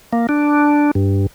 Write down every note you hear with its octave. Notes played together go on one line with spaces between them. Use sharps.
A#3
D4
G2